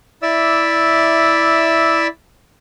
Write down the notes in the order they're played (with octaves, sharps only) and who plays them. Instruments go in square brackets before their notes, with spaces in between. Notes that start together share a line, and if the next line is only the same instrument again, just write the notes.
[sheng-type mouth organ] E4 D5 E5 D6 E6